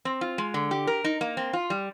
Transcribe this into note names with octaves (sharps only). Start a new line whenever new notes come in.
C4
F4
G#3
D3
G4
A#4
D#4
A#3
C4
F4
G3